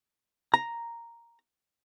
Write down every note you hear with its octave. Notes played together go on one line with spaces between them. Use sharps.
A#5